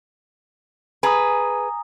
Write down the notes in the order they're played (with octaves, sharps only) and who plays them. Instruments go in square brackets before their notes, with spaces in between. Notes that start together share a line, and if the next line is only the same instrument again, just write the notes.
[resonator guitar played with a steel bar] G#4 B4 [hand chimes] G#5 A#5 D#6